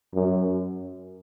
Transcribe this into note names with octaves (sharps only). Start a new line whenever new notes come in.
F#2